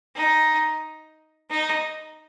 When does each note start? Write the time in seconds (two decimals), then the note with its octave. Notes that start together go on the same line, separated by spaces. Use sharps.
0.15 D#4
1.50 D#4